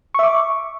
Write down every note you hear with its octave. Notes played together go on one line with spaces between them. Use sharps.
E5 C#6 D6